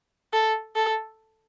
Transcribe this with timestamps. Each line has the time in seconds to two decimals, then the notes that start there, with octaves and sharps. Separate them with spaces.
0.33 A4
0.76 A4